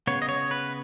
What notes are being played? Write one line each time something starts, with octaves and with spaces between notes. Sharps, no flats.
C#3 B3 C#5
D#5
C#5
B4